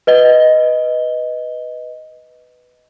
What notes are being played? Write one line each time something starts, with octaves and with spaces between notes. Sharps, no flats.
B4 D#5 G7